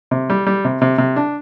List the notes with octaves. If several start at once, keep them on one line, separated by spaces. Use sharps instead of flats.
C3
G3
G3
C3
C3
C3
D4